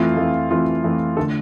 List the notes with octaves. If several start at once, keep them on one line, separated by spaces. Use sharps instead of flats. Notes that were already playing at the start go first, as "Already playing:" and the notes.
Already playing: F2 E3 A3 F4
F2 E3 A3
F2 E3 A3 F4
F2 E3 A3
D3 A3 A4